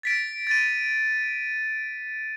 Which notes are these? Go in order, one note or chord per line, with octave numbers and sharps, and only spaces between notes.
A6 B6 D7
A6 D#7